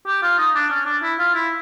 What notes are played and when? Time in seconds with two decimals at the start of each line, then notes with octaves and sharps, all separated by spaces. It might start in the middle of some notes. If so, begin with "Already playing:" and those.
0.06 G4
0.22 F4
0.38 D#4
0.55 D4
0.70 C#4
0.85 D4
1.02 E4
1.18 F4
1.34 E4